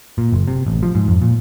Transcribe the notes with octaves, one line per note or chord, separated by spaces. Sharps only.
A#2
F#1
C3
A1
F3
G#2
F2
A#2